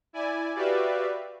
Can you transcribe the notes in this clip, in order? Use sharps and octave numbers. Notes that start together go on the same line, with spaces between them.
E4 D5 G#5
F#4 G4 B4 D5 E5 F5